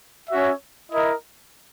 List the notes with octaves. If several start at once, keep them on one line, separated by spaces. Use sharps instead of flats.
C#4 F#4 C#5 E5
E4 A#4 D#5